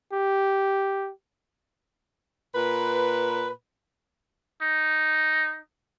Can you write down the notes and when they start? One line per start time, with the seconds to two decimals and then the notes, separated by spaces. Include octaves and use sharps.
0.13 G4
2.54 A#2 B4
4.62 D#4